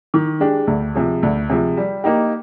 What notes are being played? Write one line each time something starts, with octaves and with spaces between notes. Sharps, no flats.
D#3
G#3 D4 G4
D2
C3 F3 G#3
D2
C3 F3 G#3
G3
A#3 D#4 G4